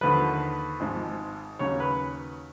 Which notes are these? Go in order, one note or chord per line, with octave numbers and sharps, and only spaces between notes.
D#2 D3 F3 B4
G#1 G#2 F3
D#2 C#3 F#3 C#5
B4